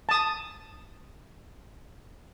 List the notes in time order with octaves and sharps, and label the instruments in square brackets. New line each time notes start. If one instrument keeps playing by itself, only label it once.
[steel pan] A5 D#6